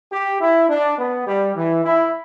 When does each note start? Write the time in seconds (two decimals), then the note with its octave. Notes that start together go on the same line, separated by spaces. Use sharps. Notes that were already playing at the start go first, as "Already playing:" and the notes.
0.12 G4
0.41 E4
0.69 D4
0.99 B3
1.27 G3
1.56 E3
1.85 E4